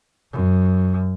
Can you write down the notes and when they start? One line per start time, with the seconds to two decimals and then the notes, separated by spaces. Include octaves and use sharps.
0.32 F#2